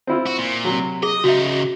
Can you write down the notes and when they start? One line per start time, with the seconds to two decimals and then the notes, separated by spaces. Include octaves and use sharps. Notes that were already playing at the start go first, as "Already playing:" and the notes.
0.07 C4 E4 F4
0.26 F#4
0.38 A#2
0.65 C3 F#3
1.03 G#4 D#5
1.24 C#3 D#4 F#4 E5